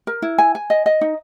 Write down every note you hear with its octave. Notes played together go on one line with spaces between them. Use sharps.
A#4
E4
G#5
G#5
D#5
D#5
D#4